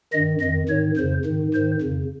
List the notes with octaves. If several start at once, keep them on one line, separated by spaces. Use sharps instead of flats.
G2 D#3 D#5
F2 D#3 D#5
G#2 D#3 C#5
F2 C#3 C5
G#2 D#3
G#2 D#3 C5
F2 C#3